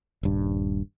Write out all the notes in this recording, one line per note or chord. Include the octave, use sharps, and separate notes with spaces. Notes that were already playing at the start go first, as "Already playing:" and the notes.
D#1 G2